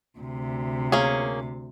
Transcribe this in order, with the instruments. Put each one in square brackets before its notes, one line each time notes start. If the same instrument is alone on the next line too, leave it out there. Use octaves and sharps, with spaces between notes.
[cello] D2 C3
[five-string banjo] A#3 C#4 G#4